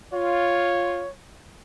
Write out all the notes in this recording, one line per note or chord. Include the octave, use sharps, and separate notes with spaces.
F4 C#5